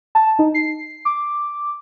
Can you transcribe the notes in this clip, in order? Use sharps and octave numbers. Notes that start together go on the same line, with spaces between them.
A5
D#4
C7
D6